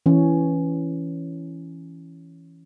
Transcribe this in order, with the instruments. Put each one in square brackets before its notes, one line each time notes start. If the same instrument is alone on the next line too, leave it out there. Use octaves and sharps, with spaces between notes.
[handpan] E3 C#4